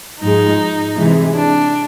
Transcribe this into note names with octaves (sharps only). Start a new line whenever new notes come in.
G#2 F3 G#3 D#4
C3 E3 G#3
D4